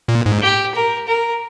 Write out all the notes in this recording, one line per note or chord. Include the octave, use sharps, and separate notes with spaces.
A#2
G#2
G4
A#4
A#4